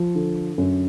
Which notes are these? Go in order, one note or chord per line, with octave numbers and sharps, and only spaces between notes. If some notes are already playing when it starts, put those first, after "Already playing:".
Already playing: F3
D3
F#2